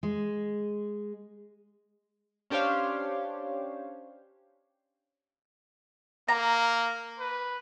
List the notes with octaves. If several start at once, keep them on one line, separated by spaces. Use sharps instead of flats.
G#3
C#4 D4 G4 C5 C#5 F5
A#3 A#5
B4